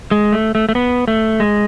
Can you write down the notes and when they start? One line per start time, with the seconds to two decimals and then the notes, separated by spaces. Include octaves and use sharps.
0.11 G#3
0.32 A3
0.55 A3
0.69 A3
0.75 B3
1.08 A3
1.40 G#3